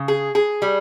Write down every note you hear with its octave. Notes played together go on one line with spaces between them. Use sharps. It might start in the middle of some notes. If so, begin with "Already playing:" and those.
Already playing: C#3
G#4
G#4
G3